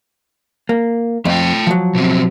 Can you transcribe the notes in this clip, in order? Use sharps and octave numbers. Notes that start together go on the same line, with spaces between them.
A#3
F2 A3 G5
F3 F#3
B2 C4